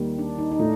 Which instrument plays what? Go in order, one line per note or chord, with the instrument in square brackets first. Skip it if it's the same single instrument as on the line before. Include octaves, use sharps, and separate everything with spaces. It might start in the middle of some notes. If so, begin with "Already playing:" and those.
Already playing: [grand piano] D#2 D#3 G3
[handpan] D4
D#4
D#4
[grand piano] A2 [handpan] D4